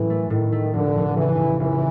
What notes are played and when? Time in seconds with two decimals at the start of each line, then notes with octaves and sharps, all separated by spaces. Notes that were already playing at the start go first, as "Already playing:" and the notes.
Already playing: A2 E3 F#3 C#4
0.10 A3
0.30 A2 D#3
0.52 A3
0.73 F1 D3
0.96 F1
1.16 C#3 E3
1.37 C#3
1.59 F1 E3